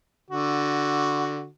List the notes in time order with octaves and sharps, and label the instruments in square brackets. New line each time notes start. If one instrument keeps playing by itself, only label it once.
[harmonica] D3 F#4